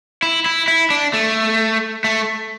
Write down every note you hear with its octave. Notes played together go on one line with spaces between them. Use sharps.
E4
E4
E4
D4
A3
A3